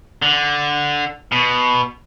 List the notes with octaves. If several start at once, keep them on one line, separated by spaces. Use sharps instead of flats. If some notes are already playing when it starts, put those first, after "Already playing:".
D3
B2